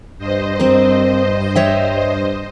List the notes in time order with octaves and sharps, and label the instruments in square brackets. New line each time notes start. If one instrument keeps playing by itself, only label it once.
[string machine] G2 C5 D#5
[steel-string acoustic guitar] C4 A#4
C#5 E5 G5